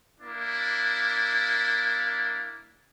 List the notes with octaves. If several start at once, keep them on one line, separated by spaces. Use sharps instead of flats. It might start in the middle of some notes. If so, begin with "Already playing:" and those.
A#3 D4 E4